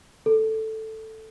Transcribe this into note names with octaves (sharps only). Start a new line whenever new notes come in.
A4